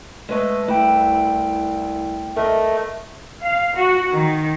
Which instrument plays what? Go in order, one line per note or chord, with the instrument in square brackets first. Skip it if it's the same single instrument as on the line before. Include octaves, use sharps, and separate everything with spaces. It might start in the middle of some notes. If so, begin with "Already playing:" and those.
[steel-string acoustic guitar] G#3 B4 D#5 [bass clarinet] A3
[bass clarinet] C2 [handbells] A3 G5 [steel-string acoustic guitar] E4
[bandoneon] A3 [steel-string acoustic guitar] A#4 D#5
[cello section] F5
F#4
D#3